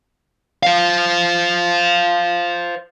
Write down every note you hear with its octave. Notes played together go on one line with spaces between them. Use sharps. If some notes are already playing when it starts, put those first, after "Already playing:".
C5 F5